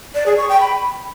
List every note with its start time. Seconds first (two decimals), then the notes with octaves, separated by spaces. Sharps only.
0.15 D5
0.26 G#4
0.38 C#6
0.49 G5
0.60 B5